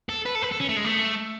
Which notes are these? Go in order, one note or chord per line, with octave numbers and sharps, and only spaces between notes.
A4
B4
A4
B4
A4
C#4
A3
G#3
A3